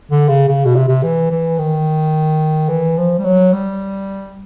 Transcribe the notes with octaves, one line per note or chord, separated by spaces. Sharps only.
D3
C#3
C#3
B2
C3
C3
E3
E3
D#3
E3
F3
G3
F#3
G3